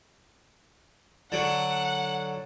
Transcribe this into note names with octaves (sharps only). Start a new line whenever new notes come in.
D3 F#3 F#5